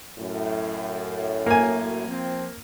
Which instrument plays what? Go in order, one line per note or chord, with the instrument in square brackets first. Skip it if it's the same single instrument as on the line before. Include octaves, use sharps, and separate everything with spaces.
[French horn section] F#2 A2
[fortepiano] A#3 G#5
[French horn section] F3 C4